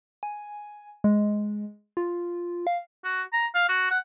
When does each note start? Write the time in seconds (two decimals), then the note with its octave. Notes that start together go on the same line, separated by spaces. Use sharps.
0.23 G#5
1.04 G#3
1.97 F4
2.67 F5
3.04 F#4
3.33 A#5
3.54 F5
3.69 F#4
3.91 F#5